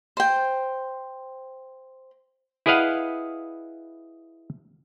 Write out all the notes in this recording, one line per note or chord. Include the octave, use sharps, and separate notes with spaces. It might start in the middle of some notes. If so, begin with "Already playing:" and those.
C5 G5
E4 G#4 B4 D#5 F5 F#5